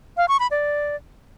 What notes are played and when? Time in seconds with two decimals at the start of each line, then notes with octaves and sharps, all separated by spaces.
0.17 F5
0.28 C#6
0.40 B5
0.51 D5